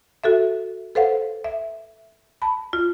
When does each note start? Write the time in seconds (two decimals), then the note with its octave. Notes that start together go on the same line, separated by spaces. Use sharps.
0.24 F#4 A4 E5
0.95 A4 B4 C5 F5 F#5
1.44 E5
2.42 A5 B5
2.73 F4